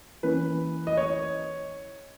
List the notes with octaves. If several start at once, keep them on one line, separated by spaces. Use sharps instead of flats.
E3 A#3 C#4 B4
D#5
C#5